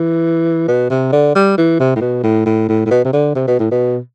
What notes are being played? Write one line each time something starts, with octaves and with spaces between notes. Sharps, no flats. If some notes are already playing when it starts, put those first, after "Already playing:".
Already playing: E3
B2
C3
D3
G3
E3
C3
A2
B2
A2
A2
A2
A2
B2
C3
D3
C3
B2
A2
B2